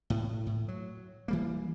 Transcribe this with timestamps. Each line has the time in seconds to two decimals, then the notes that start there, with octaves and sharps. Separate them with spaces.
0.10 A2
0.47 A2
0.68 F#3
1.28 E3 G3 A#3